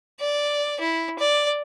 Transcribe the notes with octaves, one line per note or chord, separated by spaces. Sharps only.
D5
E4
D5